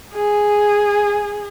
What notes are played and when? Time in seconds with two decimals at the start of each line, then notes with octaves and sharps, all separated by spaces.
0.14 G#4